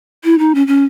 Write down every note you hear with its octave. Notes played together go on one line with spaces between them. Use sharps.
E4
D#4
C#4
C#4